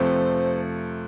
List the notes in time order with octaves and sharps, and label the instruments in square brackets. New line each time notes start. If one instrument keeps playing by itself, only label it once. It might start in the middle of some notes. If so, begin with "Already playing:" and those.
Already playing: [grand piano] F2 C3 F3 A3 [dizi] C5